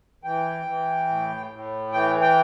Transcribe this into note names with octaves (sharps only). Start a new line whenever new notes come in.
E3 G5
E3
A2
A2
E3 G5
G5